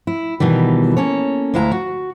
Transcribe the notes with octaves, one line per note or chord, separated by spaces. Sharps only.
E4
B2 D#3 E3 G3
A#3 C#4 A4 C#5
D2 G#3 E4 F5 A5 A#5
F#4